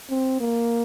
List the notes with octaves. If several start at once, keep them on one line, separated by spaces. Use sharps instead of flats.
C4
A#3